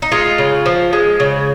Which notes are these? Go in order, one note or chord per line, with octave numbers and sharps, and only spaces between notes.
D#4
G#3 F4
C#3
F3
G#3
C#3